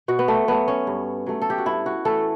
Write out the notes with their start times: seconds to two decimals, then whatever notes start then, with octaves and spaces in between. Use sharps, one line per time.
0.08 B2 F#4
0.19 B3
0.28 A3
0.48 F#3 A3 B3
0.68 C#4
0.87 G2
1.26 F#3 A3
1.42 A4
1.50 G4
1.58 F#4
1.66 G2 E4
1.86 F#4
2.05 E3 A3 A4